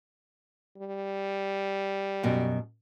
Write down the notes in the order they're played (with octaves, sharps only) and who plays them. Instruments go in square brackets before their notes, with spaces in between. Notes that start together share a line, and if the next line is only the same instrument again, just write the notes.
[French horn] G3
[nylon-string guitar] F#2 B2